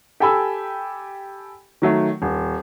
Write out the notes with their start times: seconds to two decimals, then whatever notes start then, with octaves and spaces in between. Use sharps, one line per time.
0.20 G4 A4 G5 G#5 B5 E6
1.82 D#3 F#3 A3
2.22 D#1